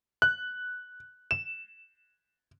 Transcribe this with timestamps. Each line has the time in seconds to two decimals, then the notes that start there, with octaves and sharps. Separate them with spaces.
0.22 F#6
1.31 E7